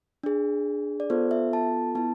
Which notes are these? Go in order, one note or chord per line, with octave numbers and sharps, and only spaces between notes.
D4 G#4
D5
B3 F4 A4 C5
E5
A5
B3 E4 A5